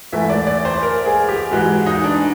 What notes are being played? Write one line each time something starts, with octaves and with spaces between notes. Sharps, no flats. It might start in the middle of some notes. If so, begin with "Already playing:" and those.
G#2 E3 A3 E5
D5
D5
C5
A#4
G#4
G4
G#2 E3 G#3 F#4
D#4
D4